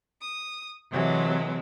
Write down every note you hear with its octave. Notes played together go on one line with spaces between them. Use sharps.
D#6
C3 E3 F#3 G#3 A3